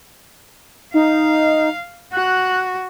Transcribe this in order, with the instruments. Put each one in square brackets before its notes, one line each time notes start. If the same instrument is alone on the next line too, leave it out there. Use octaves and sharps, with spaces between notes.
[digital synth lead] D#4 [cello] F5
[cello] F#4 [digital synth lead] F#6